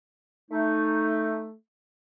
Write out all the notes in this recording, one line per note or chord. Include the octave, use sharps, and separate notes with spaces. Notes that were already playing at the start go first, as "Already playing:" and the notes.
A3 D#4